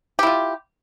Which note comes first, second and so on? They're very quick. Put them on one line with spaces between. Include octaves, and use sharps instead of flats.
G4 E4 F4